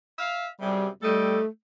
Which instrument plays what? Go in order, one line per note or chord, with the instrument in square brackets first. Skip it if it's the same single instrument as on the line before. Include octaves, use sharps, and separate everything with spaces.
[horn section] E5 F5
[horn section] F#2 C3 G#4 [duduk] G3
[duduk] G3 [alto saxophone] A3 [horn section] D#4 A4 G5